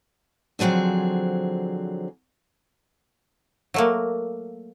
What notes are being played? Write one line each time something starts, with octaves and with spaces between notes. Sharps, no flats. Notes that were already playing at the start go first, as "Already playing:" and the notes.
D3 F3 F#3 C4 G#4
F#3 A3 A#3